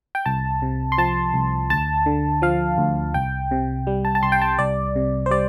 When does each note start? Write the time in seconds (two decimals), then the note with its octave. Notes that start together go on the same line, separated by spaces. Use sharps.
0.15 G5
0.26 C2 A5
0.62 C3
0.92 C6
0.98 F3 A5
1.34 C2
1.70 D2 A5
2.06 D3
2.42 F3 F5
2.78 D2
3.14 C2 G5
3.51 C3
3.87 G3
4.05 A5
4.15 A5
4.23 C2 C6
4.32 G5
4.41 A5
4.59 C2 D5
4.96 C3
5.26 C5
5.31 G3 D5